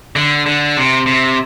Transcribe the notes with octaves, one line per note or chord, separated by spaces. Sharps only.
D3
D3
C3
C3